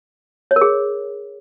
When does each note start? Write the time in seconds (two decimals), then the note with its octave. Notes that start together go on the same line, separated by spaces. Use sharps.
0.51 C#5
0.56 A#4
0.61 G#4